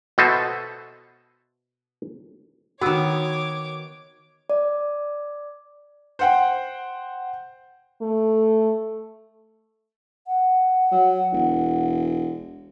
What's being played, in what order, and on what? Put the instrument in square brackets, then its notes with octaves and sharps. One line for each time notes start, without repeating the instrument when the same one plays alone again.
[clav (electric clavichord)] B2 A4 C5 D#5 E5 A5
[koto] D#3 B3 [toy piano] F#4 E6 [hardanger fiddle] C#5 D6
[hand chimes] D5
[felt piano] C5 F#5 G5
[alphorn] A3
[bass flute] F#5
[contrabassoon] F#3
E1